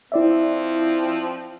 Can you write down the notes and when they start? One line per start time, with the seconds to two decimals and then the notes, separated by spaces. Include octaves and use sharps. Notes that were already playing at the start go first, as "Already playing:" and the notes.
0.12 F3 C4 E4 D5 E5